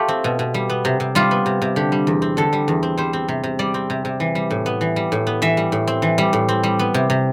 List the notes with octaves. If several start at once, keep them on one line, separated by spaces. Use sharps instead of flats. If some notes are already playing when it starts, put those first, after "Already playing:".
Already playing: A3 F4 G4
C4
B2
B2
G3
B3
C3
C3
G3 F4
B3
C3
C3
D3 G4
G3
E2
C4
D3 A4
G3
E2
C4
G3 C5
C4
C3
C3
G3 D5
C4
C3
C3
E3
G3
A2
B3
E3
G3
A2
B3
E3 E5
G3
A2
C4
E3
G3
A2
C4
G3
B3
C3
C3